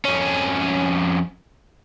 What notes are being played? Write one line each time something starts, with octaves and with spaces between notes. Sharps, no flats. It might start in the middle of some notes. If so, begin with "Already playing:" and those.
F2 C#4